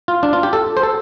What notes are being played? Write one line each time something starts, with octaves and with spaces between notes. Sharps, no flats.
F4
D4
F4
G4
A4
C5
A4